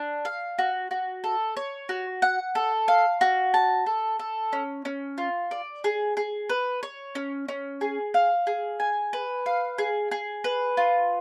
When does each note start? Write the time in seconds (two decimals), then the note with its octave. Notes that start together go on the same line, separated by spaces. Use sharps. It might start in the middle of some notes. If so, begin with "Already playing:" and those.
Already playing: D4
0.25 F5
0.59 F#4
0.91 F#4
1.24 A4
1.57 C#5
1.89 F#4
2.22 F#5
2.55 A4
2.88 F5
3.21 F#4
3.54 A5
3.86 A4
4.19 A4
4.53 C#4
4.85 C#4
5.18 F4
5.51 D5
5.84 G#4
6.17 G#4
6.49 B4
6.83 C#5
7.15 C#4
7.48 C#4
7.81 G#4
8.14 F5
8.47 G#4
8.80 G#5
9.13 B4
9.46 F5
9.78 G#4
10.11 G#4
10.44 B4
10.77 F4